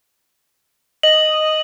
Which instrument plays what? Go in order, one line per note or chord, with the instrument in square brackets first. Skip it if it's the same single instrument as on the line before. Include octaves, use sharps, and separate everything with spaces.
[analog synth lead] D#5 [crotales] F#7